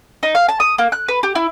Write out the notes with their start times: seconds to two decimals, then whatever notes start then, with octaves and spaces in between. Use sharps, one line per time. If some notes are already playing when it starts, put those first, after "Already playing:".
0.23 D#4
0.35 F5
0.49 A5
0.60 D#6
0.78 A#3
0.92 F#6
1.08 B4
1.23 G4
1.35 E4